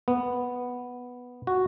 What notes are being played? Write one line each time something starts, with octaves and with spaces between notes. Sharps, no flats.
B3
F#4